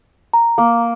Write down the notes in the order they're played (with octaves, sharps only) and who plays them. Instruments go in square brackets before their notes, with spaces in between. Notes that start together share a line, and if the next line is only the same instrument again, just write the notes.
[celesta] A#5
[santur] A#3